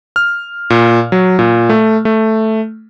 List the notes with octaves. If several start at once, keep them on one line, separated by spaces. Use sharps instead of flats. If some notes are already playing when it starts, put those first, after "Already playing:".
F6
A#2
F#3
A#2
A3
A3